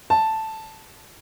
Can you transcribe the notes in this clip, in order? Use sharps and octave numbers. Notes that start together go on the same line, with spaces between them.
A5